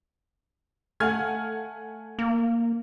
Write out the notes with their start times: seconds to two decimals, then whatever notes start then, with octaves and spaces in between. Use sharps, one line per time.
1.00 A3 F5 F#5 G#5 F6 G#6
2.19 A#3